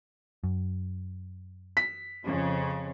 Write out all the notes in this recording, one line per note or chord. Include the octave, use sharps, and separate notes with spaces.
F#2
B6
F2 C#3 F3